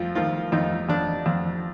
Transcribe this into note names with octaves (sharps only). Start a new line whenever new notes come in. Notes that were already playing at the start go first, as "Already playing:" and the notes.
Already playing: F2 F3 F4
D#3 F3 F4
F2 D#4
F2 D4
F2